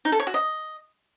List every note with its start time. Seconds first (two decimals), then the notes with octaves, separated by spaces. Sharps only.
0.05 D#4
0.12 A4
0.20 C#5
0.27 F#4
0.34 D#5